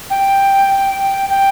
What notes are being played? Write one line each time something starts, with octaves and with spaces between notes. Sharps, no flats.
G5
G5